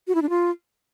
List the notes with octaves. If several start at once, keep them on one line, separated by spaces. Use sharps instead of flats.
F#4
E4
D4
F4